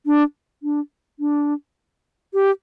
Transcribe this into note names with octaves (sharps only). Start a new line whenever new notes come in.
D4
D4
D4
G4